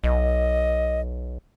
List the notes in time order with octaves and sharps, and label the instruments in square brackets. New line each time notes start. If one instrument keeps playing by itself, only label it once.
[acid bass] B1 [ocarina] D#5